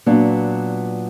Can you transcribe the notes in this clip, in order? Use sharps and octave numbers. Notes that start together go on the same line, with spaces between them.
A#2 F#3 B3 D4